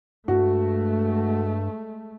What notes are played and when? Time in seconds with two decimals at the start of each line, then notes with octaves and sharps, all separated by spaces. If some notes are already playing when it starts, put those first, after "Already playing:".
0.28 G2 G#3 A3 F#4